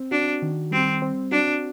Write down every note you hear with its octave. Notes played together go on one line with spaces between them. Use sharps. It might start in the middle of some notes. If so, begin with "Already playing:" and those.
Already playing: C4
D4 F#4
D#3
G3 C4
C4
D4 F#4